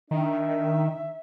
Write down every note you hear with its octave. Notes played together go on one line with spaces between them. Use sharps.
D#3 D4 E5